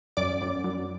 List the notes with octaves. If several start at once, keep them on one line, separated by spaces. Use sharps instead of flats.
F#2 D5 D6
F#2
F#2